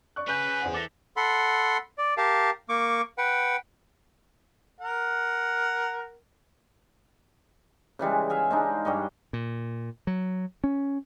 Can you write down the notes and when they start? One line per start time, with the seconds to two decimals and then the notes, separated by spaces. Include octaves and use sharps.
0.16 D5 C#6 F#6
0.28 C#4 G#4 B4 C#6 G6
0.61 E2 C5 F#5
0.74 E3 A4 D6 A#6
1.17 A4 F#5 B5 C6
1.98 D5
2.17 G4 A#4 F5 A5
2.69 A#3 C#6 D6
3.18 B4 F#5 G5
4.81 A#4 F#5
7.99 C#3 E3 G3 G#3
8.30 G#4 E5 F5
8.50 G#3 D4 D#4
8.85 G2 G3 C#5 D#5
9.33 A#2
10.07 F#3
10.64 C#4